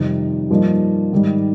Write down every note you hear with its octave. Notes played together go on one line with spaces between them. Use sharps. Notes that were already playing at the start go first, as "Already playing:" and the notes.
Already playing: F2 C3 D#3 G3
G2 F3 A#3 D#4
G#2 D#3 G3